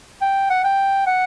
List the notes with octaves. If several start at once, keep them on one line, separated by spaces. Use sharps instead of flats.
G5
F#5
G5
F#5